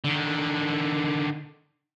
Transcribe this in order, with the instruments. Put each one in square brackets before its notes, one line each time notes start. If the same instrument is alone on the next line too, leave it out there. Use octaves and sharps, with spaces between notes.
[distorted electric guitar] D3 D#3